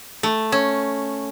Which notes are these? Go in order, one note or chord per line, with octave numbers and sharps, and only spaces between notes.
A3
C#4